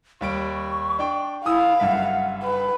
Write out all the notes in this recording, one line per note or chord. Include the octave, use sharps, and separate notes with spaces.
D#2 G3 C#6 D7
D4 D5 G5
E4 F5 G#5 D#6 E6
F#1 G2 E5 F#5
B4